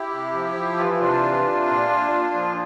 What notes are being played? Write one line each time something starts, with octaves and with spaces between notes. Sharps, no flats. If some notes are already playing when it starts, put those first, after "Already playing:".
Already playing: E4 G4
C3
F3
F3
E3 F4
E4
C3 D4 F4
E3
C3
A#2
A#2
A#2
F3